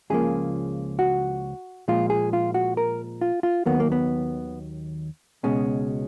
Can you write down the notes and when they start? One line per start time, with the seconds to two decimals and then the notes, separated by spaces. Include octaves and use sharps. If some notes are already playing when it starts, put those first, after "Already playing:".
0.10 C#2 C#3 F3 A#3 G#4
0.99 F#4
1.88 A#2 F3 G#3 F4
2.10 G#4
2.33 F4
2.54 F#4
2.77 A#4
3.21 F4
3.43 F4
3.66 D#2 D#3 F#3 A#3 B3
3.80 A#3
3.92 B3
5.43 C#2 B2 G#3 C#4